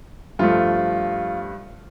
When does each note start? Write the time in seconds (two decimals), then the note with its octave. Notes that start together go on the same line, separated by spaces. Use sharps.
0.39 G2 F3 A3 F4